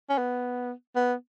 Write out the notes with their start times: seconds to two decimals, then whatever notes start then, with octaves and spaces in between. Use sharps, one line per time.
0.09 C#4
0.18 B3
0.96 B3